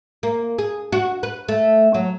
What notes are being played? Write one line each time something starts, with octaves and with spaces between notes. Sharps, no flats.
A#3
G#4
F#4
B4
A3
F#3